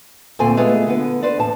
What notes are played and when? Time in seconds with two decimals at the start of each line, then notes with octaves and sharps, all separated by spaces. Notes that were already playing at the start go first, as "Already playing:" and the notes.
0.39 D2 A#2 C4 A4 C5 G#5
0.57 G#3 A3 B3 F4 G#4 B4
0.87 D3 B3 B4
1.23 B4 C5 D5
1.38 E2 A2 A5